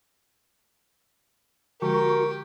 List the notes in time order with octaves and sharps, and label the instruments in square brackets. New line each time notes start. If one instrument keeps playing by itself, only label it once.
[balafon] D3 F3 G#3 [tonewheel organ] F#4 C#6 [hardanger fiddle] G4 [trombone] A#4